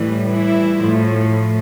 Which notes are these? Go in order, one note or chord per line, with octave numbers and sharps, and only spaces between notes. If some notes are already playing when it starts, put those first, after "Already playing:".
Already playing: A2 E3 G3
E3 E4
A2 F3